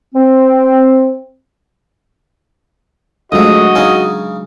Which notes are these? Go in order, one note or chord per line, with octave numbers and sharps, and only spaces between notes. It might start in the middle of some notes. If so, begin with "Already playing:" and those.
C4
F2 F#3 G#3 A3 D4 F#4 D#5
C#3 C#4 D#4